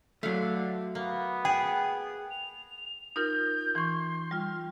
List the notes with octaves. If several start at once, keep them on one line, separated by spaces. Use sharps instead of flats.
D3 F#3 A3 F5
A#3 B3
G#4 G5
F7
D#4 F4 A#4 G6
E3 C6 C#6
G3 F4 F6